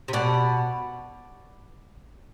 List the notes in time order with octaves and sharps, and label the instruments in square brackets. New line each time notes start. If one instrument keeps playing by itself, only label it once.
[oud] C3
[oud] B2 [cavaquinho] D5 F#5 A5